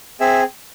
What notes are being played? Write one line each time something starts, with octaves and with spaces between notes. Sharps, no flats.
C4 G#4 E5